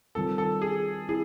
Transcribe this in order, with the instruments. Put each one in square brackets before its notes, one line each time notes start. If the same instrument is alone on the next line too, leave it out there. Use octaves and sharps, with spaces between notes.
[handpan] D#3 G3 C4 F4 A#4 [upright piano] A4
[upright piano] A4
G#4
[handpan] C4 E4 [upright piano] G#4